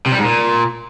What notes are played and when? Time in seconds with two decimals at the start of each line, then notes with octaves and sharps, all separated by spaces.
0.06 C3
0.12 G3
0.18 G#2
0.25 A#2